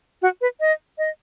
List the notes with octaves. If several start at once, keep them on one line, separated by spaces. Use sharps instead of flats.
F#4
B4
D#5
D#5